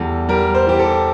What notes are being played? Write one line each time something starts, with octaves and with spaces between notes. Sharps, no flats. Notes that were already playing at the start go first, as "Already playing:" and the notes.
Already playing: E2 G3 A4
G3 A#4
C5
E3 G4
A4